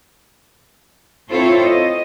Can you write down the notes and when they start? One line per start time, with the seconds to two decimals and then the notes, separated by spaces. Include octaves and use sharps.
1.31 C4 E4 F4 A4 C5 C#5
1.64 D#5